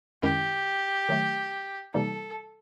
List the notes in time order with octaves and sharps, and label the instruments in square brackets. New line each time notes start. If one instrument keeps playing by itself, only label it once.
[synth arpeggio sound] F#2 D#3 G#3 C#4 E4 [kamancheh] G4
[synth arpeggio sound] D#3 F#3 A3
[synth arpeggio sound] C3 E3 G3 A#3 D#4 [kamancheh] A4